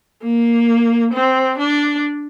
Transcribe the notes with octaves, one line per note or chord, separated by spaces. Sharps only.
A#3
C4
D4